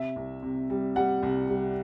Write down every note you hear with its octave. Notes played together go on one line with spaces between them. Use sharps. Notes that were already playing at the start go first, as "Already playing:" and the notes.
Already playing: C3 E5
C2
C3
G3
G3 F#5
C2
G3